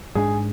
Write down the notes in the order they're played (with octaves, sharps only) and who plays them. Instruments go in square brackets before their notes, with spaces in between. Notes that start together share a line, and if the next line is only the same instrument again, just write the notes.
[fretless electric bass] G#2 G#3 D4 [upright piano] G#4